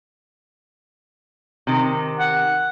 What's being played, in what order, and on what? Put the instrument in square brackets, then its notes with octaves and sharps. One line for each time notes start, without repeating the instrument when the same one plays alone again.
[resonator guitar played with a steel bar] C3 D#3
[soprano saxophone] F#5